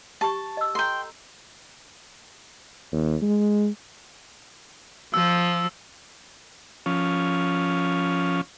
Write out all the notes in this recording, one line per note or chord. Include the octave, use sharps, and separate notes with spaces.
G4 A5 C#6
D#5 E6
A4 G5 A#5 C6
D#2
G#3
F3 E6
F3 C#4